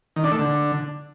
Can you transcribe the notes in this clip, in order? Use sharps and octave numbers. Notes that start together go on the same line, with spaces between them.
D#3
D4
A3
D3